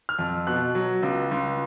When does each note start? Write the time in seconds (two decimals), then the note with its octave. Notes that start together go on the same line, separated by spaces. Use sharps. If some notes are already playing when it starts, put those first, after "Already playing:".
0.09 F6
0.19 F2
0.47 B2 F#6
0.75 F#3
1.03 C#2
1.31 C#2